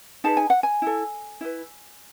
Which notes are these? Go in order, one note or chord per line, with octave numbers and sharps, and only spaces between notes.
D#4 G#4 B4 A5
G#5
F#5
G#5
E4 A4
E4 B4